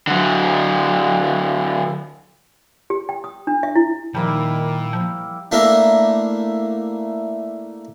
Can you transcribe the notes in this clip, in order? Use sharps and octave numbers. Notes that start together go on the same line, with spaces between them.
D3 F#3
G4
G5
D#6
D4
E5
E4
A#2 D#3 F3 G3 A#3 E4
F3
A3 A#3 D4 E4 A#4